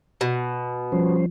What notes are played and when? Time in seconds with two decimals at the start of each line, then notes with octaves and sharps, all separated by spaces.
0.21 B2
0.92 F3 G3 C#4 C5